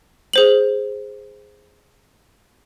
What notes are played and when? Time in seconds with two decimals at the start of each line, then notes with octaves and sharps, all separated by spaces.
0.33 G#4 C5 F#7